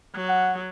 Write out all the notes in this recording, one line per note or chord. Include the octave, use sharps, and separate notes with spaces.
F#3
F#5